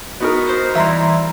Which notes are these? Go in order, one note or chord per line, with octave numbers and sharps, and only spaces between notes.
B3 D#4 F#4 A#4
C5
E3 G3 E5 A#5 C6